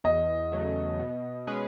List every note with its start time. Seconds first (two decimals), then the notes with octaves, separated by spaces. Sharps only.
0.04 E2 D#5
0.52 C#3 F#3 A3
0.99 B2
1.47 G#3 C#4 G#4 B4